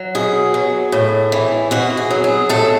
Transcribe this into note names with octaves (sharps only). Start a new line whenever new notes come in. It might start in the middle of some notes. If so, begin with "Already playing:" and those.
Already playing: F#3
B2 G#4
F#3
A2
E3
B2 F#4
G#4
F#3
G#4
A2 A4